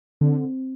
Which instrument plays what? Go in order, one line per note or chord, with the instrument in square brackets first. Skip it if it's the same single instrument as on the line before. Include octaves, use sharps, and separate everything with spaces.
[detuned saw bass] D3 [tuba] C4